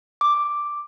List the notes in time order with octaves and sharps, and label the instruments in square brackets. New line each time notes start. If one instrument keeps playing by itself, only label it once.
[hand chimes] D6